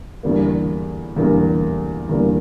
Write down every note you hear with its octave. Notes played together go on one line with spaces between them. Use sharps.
E2 D3 G3 A#3
E2 D3 G3 A#3
E2 D3 G3 A#3